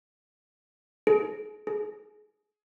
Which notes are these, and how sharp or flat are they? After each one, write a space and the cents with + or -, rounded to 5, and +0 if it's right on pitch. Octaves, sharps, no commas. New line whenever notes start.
G#4 +35
G#4 +25